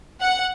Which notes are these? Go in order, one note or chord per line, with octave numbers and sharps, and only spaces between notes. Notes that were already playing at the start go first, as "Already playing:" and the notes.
F#5